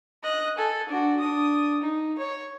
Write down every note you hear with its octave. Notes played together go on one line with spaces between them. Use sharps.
D#5 F#6
A4 G#5
D4 F#4
D4 D#6
D#4
C#5